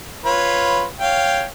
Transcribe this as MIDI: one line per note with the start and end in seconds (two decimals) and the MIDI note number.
0.24 0.85 65
0.24 0.85 71
0.24 0.85 73
1.00 1.45 73
1.00 1.45 77
1.00 1.45 79